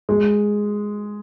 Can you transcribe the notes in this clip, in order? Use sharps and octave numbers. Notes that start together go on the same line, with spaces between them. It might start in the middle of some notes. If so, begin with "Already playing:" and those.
G#3